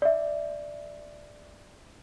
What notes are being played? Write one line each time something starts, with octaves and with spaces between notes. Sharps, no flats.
D5 E5